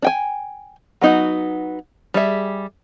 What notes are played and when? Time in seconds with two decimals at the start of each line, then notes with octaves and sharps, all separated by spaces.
0.02 D4 G5 G#5
1.01 F#3 B3 D#4 F4 F#4
2.14 G3 G#4 E5